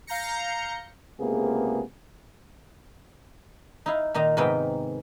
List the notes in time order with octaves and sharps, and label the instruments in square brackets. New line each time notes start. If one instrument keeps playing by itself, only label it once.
[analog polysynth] F5 A#5 G6 A#6 C#7
[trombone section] C#2 C3 A#3 B3 G#4
[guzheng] D#4 E4 F5
A#2 D#3 D#4 A#5
G#2 C3 G#3 B3 A#4 G5